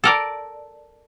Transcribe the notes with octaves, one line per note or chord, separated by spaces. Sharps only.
A4 A#4 D5